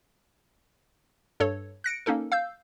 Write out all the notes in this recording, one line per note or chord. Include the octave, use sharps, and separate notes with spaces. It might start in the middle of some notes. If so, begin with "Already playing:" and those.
G2 A4 C#5
F#6 A#6 C#7 D7
A#3 C#4 D#4 A4 A#4
F5 E6 G6